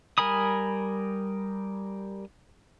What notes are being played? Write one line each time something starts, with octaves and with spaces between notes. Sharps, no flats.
G3 A#4 G#5 B5 D#6